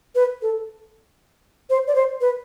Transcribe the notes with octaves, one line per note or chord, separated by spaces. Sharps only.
B4
A4
C5
D5
C5
B4